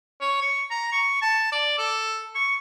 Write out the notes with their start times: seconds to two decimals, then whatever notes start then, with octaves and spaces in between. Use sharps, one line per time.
0.21 C#5
0.42 C#6
0.71 A#5
0.92 C#6
1.22 A5
1.52 D5
1.78 A4
2.35 C#6